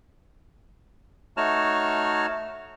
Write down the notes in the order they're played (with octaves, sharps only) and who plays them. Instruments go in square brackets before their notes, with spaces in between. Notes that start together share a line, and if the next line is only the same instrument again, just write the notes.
[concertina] A3 D#4 F#4 C#5 A5 F6